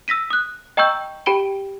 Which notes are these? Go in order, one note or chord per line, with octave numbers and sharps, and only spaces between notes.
E6 A#6 B6 D#7
D#6 F#6
D#5 G5 A#5 C#6 E6 G6
G4 G5 B5 D7 G7